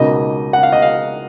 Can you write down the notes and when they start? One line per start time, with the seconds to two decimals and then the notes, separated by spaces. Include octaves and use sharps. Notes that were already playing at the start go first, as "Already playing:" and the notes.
Already playing: C#2 B2 A#3 D#4 D#5
0.53 F#5
0.63 F5
0.72 D#5
0.82 F5